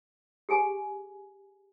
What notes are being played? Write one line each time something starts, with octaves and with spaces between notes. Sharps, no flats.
G4 G#4 G#5